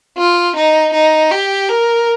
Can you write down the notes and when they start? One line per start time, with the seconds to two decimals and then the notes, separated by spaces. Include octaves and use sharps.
0.17 F4
0.56 D#4
0.94 D#4
1.31 G4
1.69 A#4